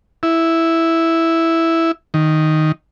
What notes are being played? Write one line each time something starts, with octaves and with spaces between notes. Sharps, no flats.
E4
D#3